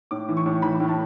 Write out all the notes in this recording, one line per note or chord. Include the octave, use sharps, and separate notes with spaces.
A2 D6
E3
C#6
A2
E3 B5
A2
A5